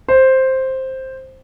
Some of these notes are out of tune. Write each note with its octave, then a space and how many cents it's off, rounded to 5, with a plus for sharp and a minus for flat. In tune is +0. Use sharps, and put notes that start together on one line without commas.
C5 +5